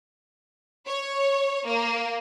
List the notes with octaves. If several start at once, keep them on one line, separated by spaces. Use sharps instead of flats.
C#5
A#3